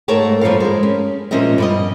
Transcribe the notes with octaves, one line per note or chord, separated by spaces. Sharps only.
G#2 A3 A#4 C#5 A5
G2 F3 A#3 A4 C#5 F5
G#3 A#4
C#4
A#2 F3 C#4 A#4 D#5 E5
G2 B2 D#5